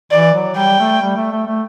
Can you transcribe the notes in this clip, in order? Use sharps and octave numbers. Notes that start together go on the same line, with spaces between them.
E3 D5
F#3
G3 G5
A3
G3
A3
A3
A3